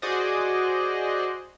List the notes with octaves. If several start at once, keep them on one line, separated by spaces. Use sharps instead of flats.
F#4 G#4 C5 D5 D#5